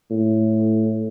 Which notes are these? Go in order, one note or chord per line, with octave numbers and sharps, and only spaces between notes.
A2